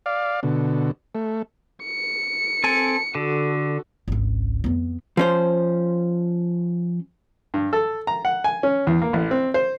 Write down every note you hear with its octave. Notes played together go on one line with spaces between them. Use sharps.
D5 F5
B2 D3
A3
C#7
C4 A4 G#5
D3 F#4 A4
G#1 C#2
F2 B3
F3 C#4 C5
G2
A4
A#5
F#5
G#5
C#4
E2
A#3
A1
C4
C5